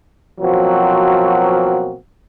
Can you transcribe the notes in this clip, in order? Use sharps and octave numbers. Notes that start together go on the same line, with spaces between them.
B2 F3 F#3 A#3 C4 F#4